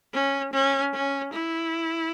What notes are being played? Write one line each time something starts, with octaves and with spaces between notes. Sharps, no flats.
C#4
C#4
C#4
E4